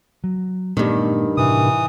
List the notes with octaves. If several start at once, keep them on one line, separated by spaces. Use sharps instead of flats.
F#3
G2 A#2 D#3 A3 B3
A2 C3 E3 D#6